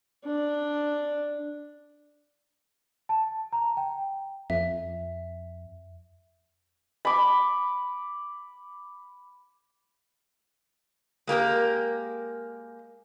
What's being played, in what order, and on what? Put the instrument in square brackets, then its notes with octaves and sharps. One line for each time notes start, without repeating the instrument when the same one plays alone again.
[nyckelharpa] D4
[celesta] A5
A#5
G5
[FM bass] F2 [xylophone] E5
[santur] B5 D6
[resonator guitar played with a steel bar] G#3 A#3 G4 A#4